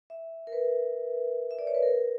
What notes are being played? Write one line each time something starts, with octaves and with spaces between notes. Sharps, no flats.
E5
A#4
B4
E5
D5
C#5
B4
A#4